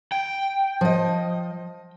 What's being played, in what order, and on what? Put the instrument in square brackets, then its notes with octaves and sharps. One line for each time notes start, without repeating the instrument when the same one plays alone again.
[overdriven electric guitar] G5
[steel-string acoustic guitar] F3 D#5